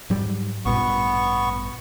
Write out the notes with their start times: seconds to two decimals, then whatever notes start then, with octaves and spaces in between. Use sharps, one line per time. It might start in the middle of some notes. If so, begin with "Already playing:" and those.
0.10 G#2 F#3 G3
0.65 A1 G2 A#2 B3 C#6